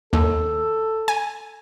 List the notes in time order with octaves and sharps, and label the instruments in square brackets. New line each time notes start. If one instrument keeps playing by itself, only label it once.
[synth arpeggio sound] D#2 [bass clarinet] A4
[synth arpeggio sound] G#5